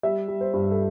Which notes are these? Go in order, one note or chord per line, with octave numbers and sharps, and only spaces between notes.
G3 E5
G3
C5
G2
A4